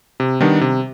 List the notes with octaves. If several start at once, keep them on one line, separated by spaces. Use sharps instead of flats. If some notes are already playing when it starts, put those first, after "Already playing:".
C3
D#3 G3 B3 D4
C3